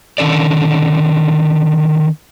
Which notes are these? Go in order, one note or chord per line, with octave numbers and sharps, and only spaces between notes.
D3 D#3 C#4 A4 D5